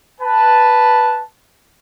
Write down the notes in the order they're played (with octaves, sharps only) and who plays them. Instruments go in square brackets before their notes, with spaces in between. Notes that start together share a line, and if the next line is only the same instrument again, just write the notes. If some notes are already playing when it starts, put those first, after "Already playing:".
[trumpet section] B4 A5